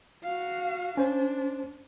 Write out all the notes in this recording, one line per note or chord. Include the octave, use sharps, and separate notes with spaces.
F#4 F5
C#4 D4 C5